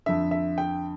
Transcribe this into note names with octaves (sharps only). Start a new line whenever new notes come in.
F2 D3 E5
E5
G5